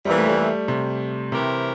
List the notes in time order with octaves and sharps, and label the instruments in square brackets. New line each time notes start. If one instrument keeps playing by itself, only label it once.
[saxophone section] F2 C3 E3 A#3 [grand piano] G3
[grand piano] A3
G3
C3
[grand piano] C3 [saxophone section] E3 A3 C4 G4 A#4